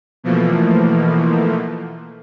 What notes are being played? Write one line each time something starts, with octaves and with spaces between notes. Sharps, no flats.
B2 E3 F3 A3 A#3